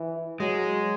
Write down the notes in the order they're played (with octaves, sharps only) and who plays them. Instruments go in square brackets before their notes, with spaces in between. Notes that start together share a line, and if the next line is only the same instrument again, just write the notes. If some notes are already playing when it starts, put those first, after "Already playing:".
Already playing: [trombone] E3
[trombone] F#3 [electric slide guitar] G#3